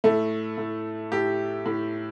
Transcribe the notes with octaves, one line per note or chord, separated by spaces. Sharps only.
A2 A3
A2
A2 G4
A2